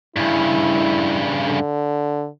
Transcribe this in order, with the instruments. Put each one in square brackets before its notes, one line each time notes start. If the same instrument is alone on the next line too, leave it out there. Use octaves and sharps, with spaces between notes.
[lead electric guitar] G2 C#3 [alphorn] E4
[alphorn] D3